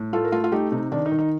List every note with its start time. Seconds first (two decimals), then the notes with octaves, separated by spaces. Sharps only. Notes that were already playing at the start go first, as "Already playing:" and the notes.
Already playing: A2
0.13 A3 F4 A4
0.25 A#4
0.32 A3 F4 A4
0.44 F4
0.52 A3 D#4 G4
0.72 C3 D#4
0.92 D#3 D4
1.06 D#4
1.12 D#3
1.19 D#4